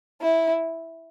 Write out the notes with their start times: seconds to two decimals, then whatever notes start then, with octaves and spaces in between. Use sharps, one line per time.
0.21 E4